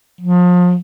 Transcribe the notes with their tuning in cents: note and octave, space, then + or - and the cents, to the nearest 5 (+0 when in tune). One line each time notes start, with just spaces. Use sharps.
F3 +35